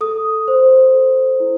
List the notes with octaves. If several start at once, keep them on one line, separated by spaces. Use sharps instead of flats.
A4 D#6
C5
A4
E4